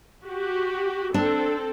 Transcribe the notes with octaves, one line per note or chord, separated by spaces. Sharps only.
F#4 G4
C4 D4 A4